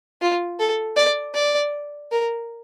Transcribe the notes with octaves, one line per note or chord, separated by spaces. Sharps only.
F4
A4
D5
D5
A#4